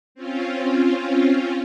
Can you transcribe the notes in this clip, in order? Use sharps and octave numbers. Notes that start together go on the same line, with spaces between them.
C4 C#4 F4